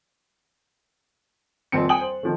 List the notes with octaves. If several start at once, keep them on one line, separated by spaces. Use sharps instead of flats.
D#1 F2 C4 C#7
G5 G#5 D#6 F#7
C5
D#3 F3 A3